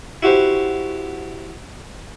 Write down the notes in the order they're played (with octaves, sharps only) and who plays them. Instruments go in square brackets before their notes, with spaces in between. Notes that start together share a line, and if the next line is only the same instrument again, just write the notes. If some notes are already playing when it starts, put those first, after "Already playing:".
[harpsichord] E4 F#4 G4 C5